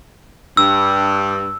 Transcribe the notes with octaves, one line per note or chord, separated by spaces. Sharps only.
G2 E6